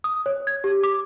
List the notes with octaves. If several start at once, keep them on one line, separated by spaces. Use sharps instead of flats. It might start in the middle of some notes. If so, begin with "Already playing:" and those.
D#6
C#5
G#6
G4
D6